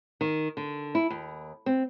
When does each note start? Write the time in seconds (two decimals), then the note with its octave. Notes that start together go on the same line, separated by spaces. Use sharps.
0.21 D#3
0.57 D3
0.95 E4
1.10 D#2
1.66 C4